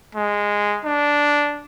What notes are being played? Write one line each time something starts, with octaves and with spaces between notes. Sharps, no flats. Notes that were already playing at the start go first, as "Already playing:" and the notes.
G#3
D4